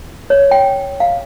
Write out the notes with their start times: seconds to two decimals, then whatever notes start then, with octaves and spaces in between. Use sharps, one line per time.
0.30 C#5
0.51 G5
1.00 F5